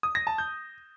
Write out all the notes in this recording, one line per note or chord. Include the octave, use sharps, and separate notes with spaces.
D#6
A#6
A5
G6